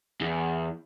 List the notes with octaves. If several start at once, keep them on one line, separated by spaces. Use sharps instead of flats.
E2